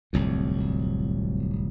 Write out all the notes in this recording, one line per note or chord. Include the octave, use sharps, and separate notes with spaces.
D1 C2 F2